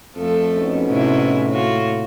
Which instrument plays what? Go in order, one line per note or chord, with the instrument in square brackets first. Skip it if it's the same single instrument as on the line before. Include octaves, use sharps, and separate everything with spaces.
[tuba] F2 [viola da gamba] F3 A3 A4
[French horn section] G#2 B2 C#4
[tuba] A2 [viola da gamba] C3 E4
[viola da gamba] A#3 F4 F#4